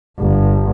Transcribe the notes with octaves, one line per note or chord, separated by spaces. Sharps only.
G1